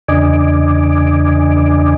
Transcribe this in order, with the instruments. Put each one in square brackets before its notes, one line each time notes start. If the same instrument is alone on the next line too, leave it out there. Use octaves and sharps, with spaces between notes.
[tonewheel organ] E2 C#3 D4 D#5 G#5 D6